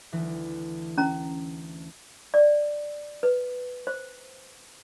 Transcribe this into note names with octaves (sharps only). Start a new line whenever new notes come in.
D2 E3
C#4 A#5
D5
B4
C5